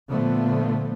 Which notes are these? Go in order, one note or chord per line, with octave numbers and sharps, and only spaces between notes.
A#2 D3 F3 A3 B3